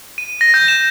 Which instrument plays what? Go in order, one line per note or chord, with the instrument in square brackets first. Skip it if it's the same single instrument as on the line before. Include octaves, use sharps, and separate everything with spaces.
[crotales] D#7
A#6
G6
E7